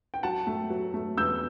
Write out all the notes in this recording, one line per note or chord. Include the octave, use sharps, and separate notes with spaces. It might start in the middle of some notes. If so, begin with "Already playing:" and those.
G5
F#3 F#5 A5
A3
F#3
A3
E2 E6 G6